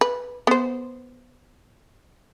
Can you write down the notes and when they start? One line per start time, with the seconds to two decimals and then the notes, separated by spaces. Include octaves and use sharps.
0.01 B4
0.47 B3 C5